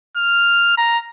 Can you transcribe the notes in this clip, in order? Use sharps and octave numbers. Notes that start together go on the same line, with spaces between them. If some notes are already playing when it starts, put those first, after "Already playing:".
F6
A#5